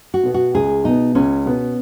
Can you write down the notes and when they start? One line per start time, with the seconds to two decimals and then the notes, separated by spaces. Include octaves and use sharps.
0.14 F#4
0.23 B2 B3
0.34 F#4
0.54 C#2 G#4
0.84 B2 B3 D#4
1.15 C#2 C#4
1.46 B2 B3